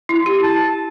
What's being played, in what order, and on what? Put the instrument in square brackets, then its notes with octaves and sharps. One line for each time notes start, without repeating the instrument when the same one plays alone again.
[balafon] E4
G4
[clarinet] A5